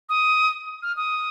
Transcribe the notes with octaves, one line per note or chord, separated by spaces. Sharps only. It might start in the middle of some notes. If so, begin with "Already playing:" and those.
D#6
F6
D#6